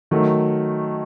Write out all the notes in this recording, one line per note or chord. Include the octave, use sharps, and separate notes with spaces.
D#3 F#3 A3